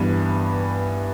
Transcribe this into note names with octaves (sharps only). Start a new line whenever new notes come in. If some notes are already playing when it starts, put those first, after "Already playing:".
Already playing: G2 E3 B3